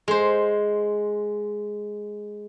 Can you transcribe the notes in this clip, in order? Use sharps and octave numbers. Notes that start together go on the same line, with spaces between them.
G#3 C5